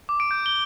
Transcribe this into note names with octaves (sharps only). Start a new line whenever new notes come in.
D6
D7
G6
G7